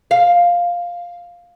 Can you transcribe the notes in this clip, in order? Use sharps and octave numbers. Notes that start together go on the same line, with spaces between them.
F5